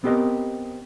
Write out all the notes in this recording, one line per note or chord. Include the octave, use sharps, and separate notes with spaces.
B3 C4 G4 A#4 D#5